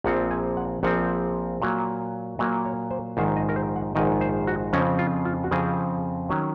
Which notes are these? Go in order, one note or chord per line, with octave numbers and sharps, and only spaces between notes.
A#1 A#2 F3 C4 F#5
G#5
F#5
A#1 A#2 F3 C4 F#5
A#2 F#3 A#3
A#2 F#3 A#3 D#5
C#5
C5
A#1 G#2 D#3 C5
D#5
A#4
C5
F#5
A#1 G#2 D#3 D#5
C5
F#4
F2 C#3 F3 C4 C#4
F4
F4
F#4
F2 C#3 F3 C4 G#4
D#3 F#3 C#4